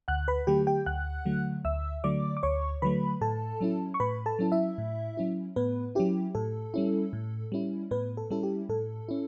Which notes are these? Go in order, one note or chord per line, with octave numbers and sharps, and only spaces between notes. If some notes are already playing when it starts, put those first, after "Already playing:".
D2 F#5 F#6
B4 B5
D3 F#3 A3 G4 G5
G4 G5
D2 F#5 F#6
D3 F#3 A3
D2 E5 E6
D3 F#3 A3 D5 D6
D6
D2 C#5 C#6
D3 F#3 A3 B4 B5
A2 A4 A5
F#3 C#4 E4
C#6
A2 B4 B5
A4 A5
F#3 C#4 E4
E4 E5
A2
F#3 C#4 E4
A2 B3 B4
F#3 C#4 E4 G4
A2 A4
G3 C#4 E4
A2
G3 C#4 E4
A2 B3 B4
A4
G3 C#4 E4 A4
G4
A2 A4
C#4 E4